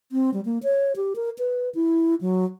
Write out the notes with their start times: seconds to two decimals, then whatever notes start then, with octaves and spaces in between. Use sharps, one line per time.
0.12 C4
0.34 G3
0.45 A#3
0.63 C#5
0.96 G4
1.16 A#4
1.39 B4
1.75 E4
2.21 F#3